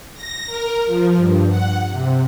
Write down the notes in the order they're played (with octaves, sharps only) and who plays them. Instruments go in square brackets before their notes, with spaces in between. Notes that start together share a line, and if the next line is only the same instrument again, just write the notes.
[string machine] A#6
A#4
F3
G2
F#5
C3